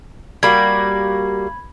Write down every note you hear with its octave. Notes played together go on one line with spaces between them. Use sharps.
G3 A#3 F#4 B5 G#6